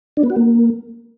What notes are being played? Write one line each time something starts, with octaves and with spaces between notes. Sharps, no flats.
D4
B3
F#4
A#3